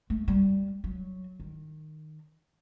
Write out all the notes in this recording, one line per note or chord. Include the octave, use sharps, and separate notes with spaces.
A3
G3
F#3
D#3